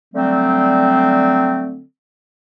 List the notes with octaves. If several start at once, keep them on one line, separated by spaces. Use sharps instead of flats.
D3 F#3 G3 A3 C4